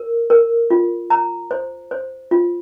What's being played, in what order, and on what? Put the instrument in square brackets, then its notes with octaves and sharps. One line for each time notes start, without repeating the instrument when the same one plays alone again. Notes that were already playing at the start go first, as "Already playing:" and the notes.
Already playing: [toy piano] A#4
A#4
F4
A#5
C5
C5
F4